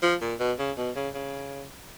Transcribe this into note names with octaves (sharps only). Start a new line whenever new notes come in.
F3
A#2
B2
C#3
B2
C#3
C#3